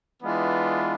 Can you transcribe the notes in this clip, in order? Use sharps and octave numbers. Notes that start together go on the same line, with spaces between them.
E3 G#3 B3 D4 F4